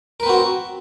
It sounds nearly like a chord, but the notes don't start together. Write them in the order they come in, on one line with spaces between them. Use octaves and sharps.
A#4 B4 C4 F#4